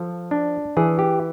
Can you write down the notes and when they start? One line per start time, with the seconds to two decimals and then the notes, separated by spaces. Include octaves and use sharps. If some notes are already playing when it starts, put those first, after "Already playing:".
Already playing: F3 A4
0.31 D4
0.77 E3 G#4
0.99 G4